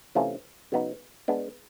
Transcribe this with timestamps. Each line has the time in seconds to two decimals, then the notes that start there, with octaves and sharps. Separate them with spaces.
0.15 C3 E3 A3 C#4 F4
0.72 C#3 F#3 B3 D#4
1.28 G#3 B3 D4